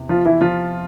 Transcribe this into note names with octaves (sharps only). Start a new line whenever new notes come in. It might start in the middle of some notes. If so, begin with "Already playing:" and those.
Already playing: E2 C3
F3 F4
E3 E4
F3 F4